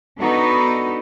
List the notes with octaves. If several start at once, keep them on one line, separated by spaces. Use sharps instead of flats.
B3 D4 D#4 F#4 A4 B4